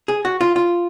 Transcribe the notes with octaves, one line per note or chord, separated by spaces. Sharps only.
G#4
F#4
F4
F4